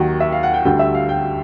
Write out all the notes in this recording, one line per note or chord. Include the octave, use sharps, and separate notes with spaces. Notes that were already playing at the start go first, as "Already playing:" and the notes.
Already playing: D#2 D#3 F#3 F#5
E5
F5
F#5
G5
D2 D3 G3 G5
E5
F5
G5